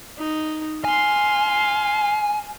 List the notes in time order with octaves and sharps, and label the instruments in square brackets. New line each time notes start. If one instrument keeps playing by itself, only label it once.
[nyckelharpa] D#4
[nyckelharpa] F5 C6 [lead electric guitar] G#5